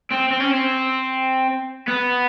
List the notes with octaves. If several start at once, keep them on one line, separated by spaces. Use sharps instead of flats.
C4
C4
C#4
C4
B3